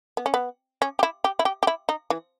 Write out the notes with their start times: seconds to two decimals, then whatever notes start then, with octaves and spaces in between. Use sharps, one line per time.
0.17 B3
0.26 C#4
0.34 B3
0.82 C#4
0.99 G4
1.03 E4
1.24 G4
1.39 E4
1.45 G4
1.63 G4
1.67 E4
1.89 D#4
2.10 E3